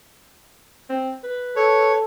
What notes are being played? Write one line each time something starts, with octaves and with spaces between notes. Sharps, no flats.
C4
B4
A4 C#5